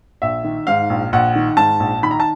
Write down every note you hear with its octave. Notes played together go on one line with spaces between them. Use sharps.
A#1 E5
D#3
G#2 F5
A#1
A#1 F#5
D#3
G#2 A5
A#1
D#3 B5
A#5
A5